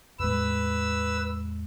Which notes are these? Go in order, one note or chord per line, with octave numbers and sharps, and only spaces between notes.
E2 A2 G#3 B4 E6